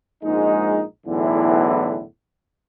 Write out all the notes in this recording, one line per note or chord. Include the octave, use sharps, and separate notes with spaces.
A#1 G#2 G#3 D#4
B1 E2 A2 D3 E3 E4